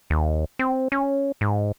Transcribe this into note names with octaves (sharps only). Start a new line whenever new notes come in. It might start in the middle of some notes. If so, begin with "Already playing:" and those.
D#2
C4
C#4
G#2